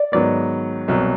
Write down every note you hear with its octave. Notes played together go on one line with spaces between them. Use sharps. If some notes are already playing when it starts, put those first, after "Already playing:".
Already playing: D5
G#2 D#3 F#3 B3 D5
C2 B2 F#3